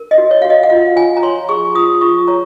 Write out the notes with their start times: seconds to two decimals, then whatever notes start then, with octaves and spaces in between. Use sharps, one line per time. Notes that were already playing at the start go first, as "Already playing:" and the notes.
Already playing: A#4
0.11 D#5
0.18 F#4
0.31 C#5
0.42 F#4 F5
0.50 D#5
0.63 F#5
0.70 F4 F5
0.96 F4 G#5
1.17 A#5
1.23 C#5 C6
1.49 G#4 C#6
1.75 F4 D#6
2.01 F4 C#6
2.27 C#5 A#5